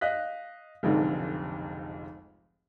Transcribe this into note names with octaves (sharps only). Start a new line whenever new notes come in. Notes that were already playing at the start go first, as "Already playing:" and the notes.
D#5 F5 F#6 B6
F1 B1 F2 G#2 D3